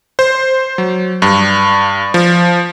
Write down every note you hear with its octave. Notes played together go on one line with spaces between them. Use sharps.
C5
F#3
G2
F3